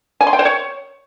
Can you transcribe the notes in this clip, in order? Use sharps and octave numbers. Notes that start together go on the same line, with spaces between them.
G#5
C6
G5
C5
C#5